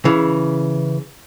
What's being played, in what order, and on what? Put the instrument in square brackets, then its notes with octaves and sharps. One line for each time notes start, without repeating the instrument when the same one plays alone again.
[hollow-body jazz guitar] C#3 E3